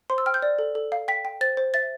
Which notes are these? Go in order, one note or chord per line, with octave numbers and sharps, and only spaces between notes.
C5 C6
E6
G5 F6
G6
D5
A4
A4
F5
G5 B6
G5
C5 A6
C5
E5 A6